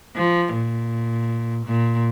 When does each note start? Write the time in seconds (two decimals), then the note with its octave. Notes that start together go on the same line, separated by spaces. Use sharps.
0.16 F3
0.53 A#2
1.66 A#2